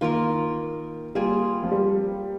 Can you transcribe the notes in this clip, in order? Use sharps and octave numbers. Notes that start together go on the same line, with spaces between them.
D#3 A#3 F4 A#4
G3 A#3 F4 G#4
F3
G3